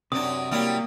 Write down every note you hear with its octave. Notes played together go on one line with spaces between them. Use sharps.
F#2 C3 F#3 D4 D#6
F#3 G3 A#3 E4